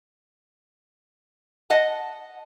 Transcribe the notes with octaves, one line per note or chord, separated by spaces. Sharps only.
D#5 F#5 A5